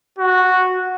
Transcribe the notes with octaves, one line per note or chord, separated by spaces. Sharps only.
F#4